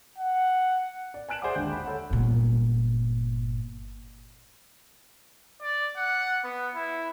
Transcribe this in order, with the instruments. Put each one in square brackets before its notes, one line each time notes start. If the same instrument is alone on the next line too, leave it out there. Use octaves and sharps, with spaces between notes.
[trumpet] F#5
[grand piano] D5
G#5 A5 F#6 D7 E7 F#7
G#4 C5 D5 E5 F#5 D6
G#1 D#2 D3 G5 G6
B5
A4 C#5 F#5
[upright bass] G1 A#2
[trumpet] D5
F#5
B3
E4